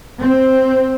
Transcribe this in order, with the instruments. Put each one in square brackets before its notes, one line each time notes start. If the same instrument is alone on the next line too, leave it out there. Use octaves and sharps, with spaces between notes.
[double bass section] C4